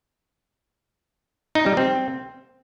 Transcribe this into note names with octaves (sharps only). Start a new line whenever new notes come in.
D#4
G3
C4